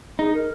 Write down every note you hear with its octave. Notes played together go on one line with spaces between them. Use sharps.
D#4 G#4
A#4